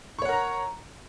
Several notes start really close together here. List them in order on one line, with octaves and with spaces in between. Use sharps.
C#6 C#5 F#5 A#4 A#5